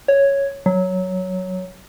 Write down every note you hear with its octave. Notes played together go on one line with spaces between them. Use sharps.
C#5
F#3